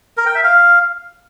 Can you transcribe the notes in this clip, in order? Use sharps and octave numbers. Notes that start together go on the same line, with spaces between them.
A#4
G5
E5
F5